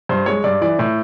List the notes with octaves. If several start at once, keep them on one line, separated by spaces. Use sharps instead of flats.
G2 C5
G#3 C#5
G2 D5
E3 D5
A2